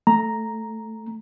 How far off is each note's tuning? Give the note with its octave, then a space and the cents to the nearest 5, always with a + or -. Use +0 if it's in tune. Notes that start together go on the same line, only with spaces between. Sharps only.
A3 +0 A#5 +0